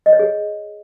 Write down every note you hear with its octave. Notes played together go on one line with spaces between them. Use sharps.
D#5
C#5
G#4